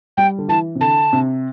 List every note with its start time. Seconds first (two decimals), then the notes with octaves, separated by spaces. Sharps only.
0.17 G3 G5
0.38 D3
0.48 E3 A5
0.75 C3
0.81 D3 A5
1.13 C3